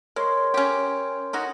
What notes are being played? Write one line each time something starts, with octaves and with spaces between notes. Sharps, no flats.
G#3 A#4 C#5 C6
C#4 G4
C#4 D#4 F#4